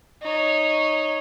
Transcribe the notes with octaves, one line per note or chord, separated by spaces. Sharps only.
D#4 C#5